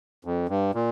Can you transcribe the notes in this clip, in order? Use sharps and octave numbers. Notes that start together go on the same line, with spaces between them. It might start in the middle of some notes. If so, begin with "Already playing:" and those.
F2
G2
A#2